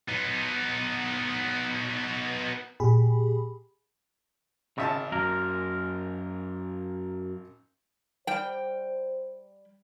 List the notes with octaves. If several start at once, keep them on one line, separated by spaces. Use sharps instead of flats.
B3 D#4
A#2 G4 G#4 B5
G#1 C#3 E5 A5
F#2 A#3 A#4
G3 C5 G5